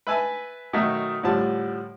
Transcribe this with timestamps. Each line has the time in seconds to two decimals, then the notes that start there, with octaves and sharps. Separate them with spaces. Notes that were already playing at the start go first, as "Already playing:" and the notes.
0.07 B4 E5 G#5 A5
0.73 B2 D#3 F#3 A3
1.23 A2 D3 F3 G3 A5